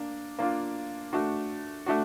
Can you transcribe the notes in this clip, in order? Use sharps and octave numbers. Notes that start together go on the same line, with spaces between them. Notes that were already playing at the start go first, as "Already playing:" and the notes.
Already playing: A#3 D4
A#3 D4 F4
A3 D4 F#4
A3 D4 F#4